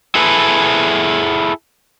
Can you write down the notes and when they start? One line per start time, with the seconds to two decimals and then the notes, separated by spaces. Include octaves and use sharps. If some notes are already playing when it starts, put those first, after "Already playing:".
0.15 E4 G#4 A4 B4